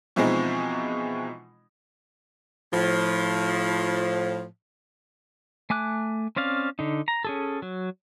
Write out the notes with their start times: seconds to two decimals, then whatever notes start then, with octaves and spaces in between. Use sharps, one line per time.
0.16 B2 E3 F3 G#3 C4 D#4
2.73 A2 F3
5.70 A3 G#5 D6 F#6
6.36 C4 C#4 D5 F5
6.79 D3 D#4
7.08 A#5
7.25 C#4 G#4 A4
7.62 F#3